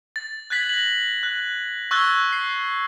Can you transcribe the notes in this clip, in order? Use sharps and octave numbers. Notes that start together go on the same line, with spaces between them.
A6
F#6 G#6 A6 B6 F#7
A#6 F#7
F#6
C#6 E6 F#6 G#6 A6 G7
C7